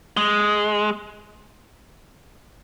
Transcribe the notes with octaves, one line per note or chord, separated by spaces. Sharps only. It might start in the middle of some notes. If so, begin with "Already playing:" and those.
G#3